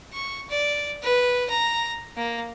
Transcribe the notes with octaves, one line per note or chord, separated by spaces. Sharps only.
C#6
D5
B4
A#5
A#3